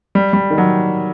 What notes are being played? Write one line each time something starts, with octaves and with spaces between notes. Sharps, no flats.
G3
G3
D#3
F#3